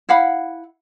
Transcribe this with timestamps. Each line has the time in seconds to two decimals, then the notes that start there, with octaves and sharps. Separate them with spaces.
0.09 E4 F5 F#5 B5